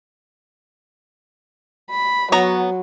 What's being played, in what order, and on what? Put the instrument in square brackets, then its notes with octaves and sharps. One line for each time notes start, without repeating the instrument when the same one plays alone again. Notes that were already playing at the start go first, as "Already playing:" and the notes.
[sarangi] B5
[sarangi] F#3 [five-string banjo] B3 C#5 A#5